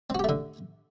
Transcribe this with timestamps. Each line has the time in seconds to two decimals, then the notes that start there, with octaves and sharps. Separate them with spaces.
0.10 C4
0.15 F#4
0.19 G4
0.24 A3
0.29 D3